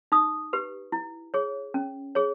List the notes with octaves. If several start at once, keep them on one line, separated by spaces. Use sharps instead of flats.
D#4 D#6
G4 B4
E4
G#4 C#5
C#4
G#4 C#5